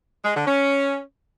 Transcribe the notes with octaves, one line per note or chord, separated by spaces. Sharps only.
G#3
D3
C#4